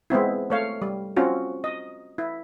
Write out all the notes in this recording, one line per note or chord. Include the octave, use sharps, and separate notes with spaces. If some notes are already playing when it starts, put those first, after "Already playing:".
G#3 B3 C4 E4
A3 C#5 F5
G3
C4 C#4 F4 F#4
D#5
E4